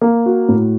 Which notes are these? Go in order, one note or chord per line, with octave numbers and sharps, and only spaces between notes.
A#3
F#4
A2